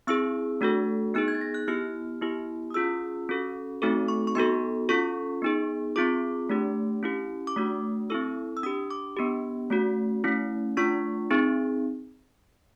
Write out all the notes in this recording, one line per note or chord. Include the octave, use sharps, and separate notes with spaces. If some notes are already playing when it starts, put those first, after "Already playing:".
C4 E4 G#4 E6
A3 D4 F#4 A4
B3 D#4 G#4 F#6
G#6
A6
A#6
F#6
B3 E4 G4 F6
B3 E4 G4
D#6
C#4 F4 G#4 E6
C#4 F#4 A4
A3 C4 D#4 F#4 A4 D6
C#6
C#6
B3 D#4 F#4 A4 C6
C#4 F4 A4 C#6
B3 D#4 G#4
C4 F4 G#4 D6
A3 D4 G4
C#4 E4 G4
D6
A3 D4 F#4 D#6
C4 E4 A4 E6
E6
D4 G4 D#6
D6
B3 D4 G4
A3 C#4 F#4
A3 C#4 E4
A3 D4 F4 C#6
C4 D#4 G#4